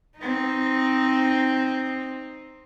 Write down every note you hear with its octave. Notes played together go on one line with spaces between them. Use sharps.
C4 D#4